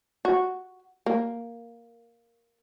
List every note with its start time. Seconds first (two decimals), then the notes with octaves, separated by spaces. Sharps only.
0.25 F#4
1.06 A#3